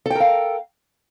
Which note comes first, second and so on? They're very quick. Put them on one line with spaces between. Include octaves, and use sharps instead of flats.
A4 G5 A#4 F5